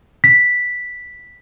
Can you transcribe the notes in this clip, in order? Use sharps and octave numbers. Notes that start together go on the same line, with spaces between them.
B6